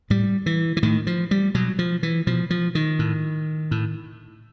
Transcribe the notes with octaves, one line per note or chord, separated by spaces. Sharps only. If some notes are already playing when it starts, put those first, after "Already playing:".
A2 G3
E3
E3
A2 D#3
F3
G3
B2 F#3
F3
E3
B2 F3
F3
D#3
A2
A2